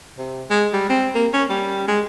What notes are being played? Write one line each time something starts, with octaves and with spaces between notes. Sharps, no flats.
C3
G#3
G3
C4
A#3
C#4
G3
G#3